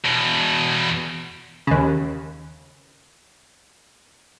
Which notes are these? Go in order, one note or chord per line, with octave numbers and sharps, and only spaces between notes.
E2 B2
D#2 C#3